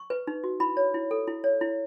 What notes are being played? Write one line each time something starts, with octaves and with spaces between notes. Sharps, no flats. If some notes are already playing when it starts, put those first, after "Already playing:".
Already playing: C#6
B4
D#4
F#4
E4 B5
C#5
E4
A4
E4
C#5
E4